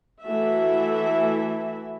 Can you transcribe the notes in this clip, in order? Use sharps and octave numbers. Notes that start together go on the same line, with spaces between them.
E3 A3 F#4 E5